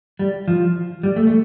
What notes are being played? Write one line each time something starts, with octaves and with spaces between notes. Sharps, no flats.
G3
F3
G3
A3
A3